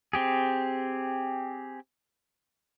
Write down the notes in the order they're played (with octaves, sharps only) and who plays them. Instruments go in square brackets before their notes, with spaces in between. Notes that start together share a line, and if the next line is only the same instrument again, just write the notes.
[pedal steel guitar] C4 G4 G#4